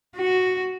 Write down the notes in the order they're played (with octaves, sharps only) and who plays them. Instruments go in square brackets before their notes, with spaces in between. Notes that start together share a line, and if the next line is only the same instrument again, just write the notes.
[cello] F#4